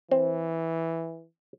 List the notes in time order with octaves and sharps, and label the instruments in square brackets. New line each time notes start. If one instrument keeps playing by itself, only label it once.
[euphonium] E3 [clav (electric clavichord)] C4